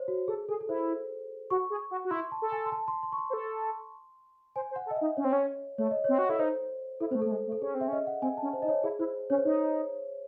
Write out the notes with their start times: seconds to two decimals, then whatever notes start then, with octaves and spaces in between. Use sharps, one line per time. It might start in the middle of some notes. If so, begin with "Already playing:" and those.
Already playing: C5 C#5
0.08 F#4
0.28 G#4 A4
0.49 G#4 A4
0.61 A4
0.68 E4 C5
1.50 F#4 C#6
1.70 G#4
1.91 F#4
2.05 F#4
2.11 E4 C6
2.32 A5
2.42 A4
2.52 G#5
2.66 C6
2.72 A5
2.88 C6
3.03 C6
3.12 C#6
3.18 C6
3.30 C5
3.34 A4
4.56 C5 G#5
4.71 C5
4.76 F#5
4.86 A4
4.91 D#5
4.96 D#4 E5
5.17 C#4 C#5
5.24 C4
5.33 C#4
5.78 A3 C#5
5.91 D#5
6.04 C4 C#5
6.19 F#4
6.29 E4 A4
6.39 D#4 C5
7.00 E4 A4
7.11 A3 C4 C5
7.22 A3 A4
7.32 G#3
7.47 A3
7.52 A4
7.61 C#4 G#4
7.74 C4
7.81 E5
7.88 C#4 D#5
8.07 F#5
8.22 C4 G#5
8.37 C#4 A5
8.53 C5
8.62 D#4 D#5
8.68 C#5
8.83 E4 G#4
8.99 E4 C5
9.30 C#4 C#5
9.37 C5
9.45 D#4 C#5